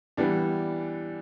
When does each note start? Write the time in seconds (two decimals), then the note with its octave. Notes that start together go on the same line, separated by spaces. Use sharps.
0.17 E3 G3 B3 D4